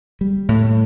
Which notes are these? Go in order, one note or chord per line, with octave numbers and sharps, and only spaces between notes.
G3
A2